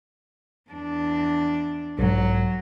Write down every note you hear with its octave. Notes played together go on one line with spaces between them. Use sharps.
E2 D4
B1 G#2 F#3